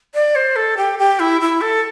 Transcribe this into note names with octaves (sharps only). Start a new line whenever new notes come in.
D5
C5
A4
G4
G4
E4
E4
A4